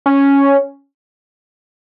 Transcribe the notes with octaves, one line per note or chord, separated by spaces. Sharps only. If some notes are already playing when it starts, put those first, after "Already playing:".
C#4